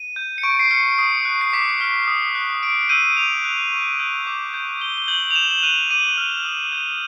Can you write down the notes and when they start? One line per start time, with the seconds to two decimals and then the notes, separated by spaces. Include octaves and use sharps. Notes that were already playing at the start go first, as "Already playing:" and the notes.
Already playing: D#7
0.16 G6
0.38 C#7
0.43 C#6 D7
0.59 C7
0.71 F6 C#7
0.98 D#6 C7
1.25 F#6
1.41 C7
1.53 D6 B6
1.81 F6
2.07 D#6
2.35 F#6
2.62 C#6 D7
2.89 E6 G6 D#7
3.17 D6 F7
3.45 F#6
3.72 C#6
3.99 E6 G6
4.27 D6
4.54 G6
4.81 D#6 G7
4.98 G7
5.08 G6 F#7
5.31 F7
5.36 D6 E7
5.51 E7
5.63 F#6 D#7
5.90 D6 D#7
6.18 F6
6.45 D#6
6.72 G6